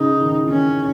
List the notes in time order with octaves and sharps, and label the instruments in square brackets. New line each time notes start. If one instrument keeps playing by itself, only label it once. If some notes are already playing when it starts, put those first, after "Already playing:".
Already playing: [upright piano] C#3 [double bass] D#4
[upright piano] D#3
E3
[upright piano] D#3 [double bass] C#4